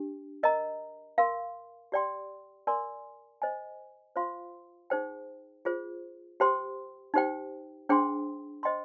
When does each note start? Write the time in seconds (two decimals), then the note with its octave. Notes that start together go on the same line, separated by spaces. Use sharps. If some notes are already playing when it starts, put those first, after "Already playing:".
Already playing: D4 G4
0.43 A#4 D#5 A#5
1.18 A#4 F5 C6
1.92 G4 D5 G5 C6
2.67 A#4 D5 G#5 C6
3.42 C5 D#5 G#5
4.16 F4 C5 F5 C6
4.90 D#4 G#4 C5 G5
5.65 F4 G#4 C5
6.40 G4 C5 G5 C6
7.14 D#4 G4 C5 G5
7.89 D4 G#4 C5 G5 C6
8.63 C5 D#5 G5 C6